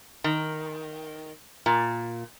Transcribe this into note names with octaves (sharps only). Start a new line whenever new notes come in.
D#3
A#2